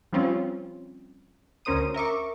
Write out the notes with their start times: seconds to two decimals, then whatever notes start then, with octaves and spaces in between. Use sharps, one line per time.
0.13 F3 G3 C4 C#4 F4
1.65 D2 C#4 A#4 C5 D#6 D#7
1.94 A#4 E5 C#6 D6